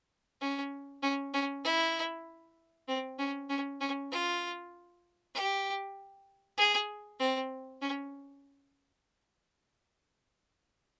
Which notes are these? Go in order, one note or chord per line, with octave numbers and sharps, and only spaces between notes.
C#4
C#4
C#4
E4
C4
C#4
C#4
C#4
F4
G4
G#4
C4
C#4